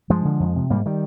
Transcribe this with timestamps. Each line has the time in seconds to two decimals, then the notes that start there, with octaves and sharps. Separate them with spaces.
0.10 G2 F3 G#3
0.25 D3
0.40 F2
0.56 C3
0.70 G#2 G3 A#3
0.86 D#3 G3